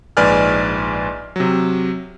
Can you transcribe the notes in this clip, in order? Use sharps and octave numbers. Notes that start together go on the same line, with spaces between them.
A#1 G#2 B4 D5 G#5 F6
C3 F#3